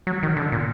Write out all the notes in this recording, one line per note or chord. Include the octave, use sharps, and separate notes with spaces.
F#3
D#3
D3
A#2